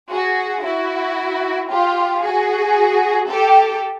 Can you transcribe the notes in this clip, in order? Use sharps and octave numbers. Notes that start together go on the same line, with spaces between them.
F#4 G#4
E4 F#4
F4 G4
F#4 G#4
G4 A4